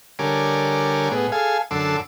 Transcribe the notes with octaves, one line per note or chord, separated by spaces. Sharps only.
D3 G3 A#4 C#5 G#5 D6
A2 B3 G#4
G#4 A4 F5 G#5
F#2 D3 A4 C6 D6 E6